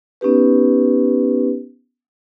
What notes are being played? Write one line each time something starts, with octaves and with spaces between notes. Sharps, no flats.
B3 C#4 D#4 G4 B4